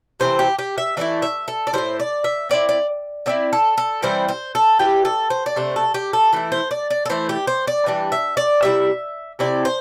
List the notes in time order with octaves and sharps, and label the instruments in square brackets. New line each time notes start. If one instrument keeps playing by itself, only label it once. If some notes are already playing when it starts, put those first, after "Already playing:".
[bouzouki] C3 E3 A3 C4 C5
G4
G4
E5
E3 A3 C4 E4 D5
E5
A4
D5
G3 E4 C5
A2
D5
E5
D3 C4 E4 D5
D5
D3 C4 E4 D5
A4
A4
E3 G3 C4 E4 C5
C5
A4
E3 G3 E4 G4
A4
C5
D5
C3 A3 D4 C5
A4
G4
A4
E3 A3 E4
C5
D5
D5
A4
E3 A3 E4 C5
G4
C5
D5
E3 G3 D4
E5
D5
C3 G3 E4 E5
C3 A3 C4 E4 D5
C5